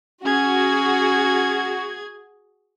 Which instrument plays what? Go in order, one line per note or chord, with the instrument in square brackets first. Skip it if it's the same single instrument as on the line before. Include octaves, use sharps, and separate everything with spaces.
[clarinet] C#4 [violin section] F#4 [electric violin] G#4 G#6